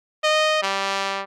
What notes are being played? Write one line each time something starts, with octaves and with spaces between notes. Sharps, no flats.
D#5
G3